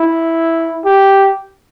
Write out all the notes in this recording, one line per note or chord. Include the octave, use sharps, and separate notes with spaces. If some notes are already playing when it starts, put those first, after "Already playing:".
Already playing: E4
G4